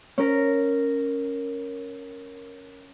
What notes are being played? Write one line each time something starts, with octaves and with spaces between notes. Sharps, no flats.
C#4 A#4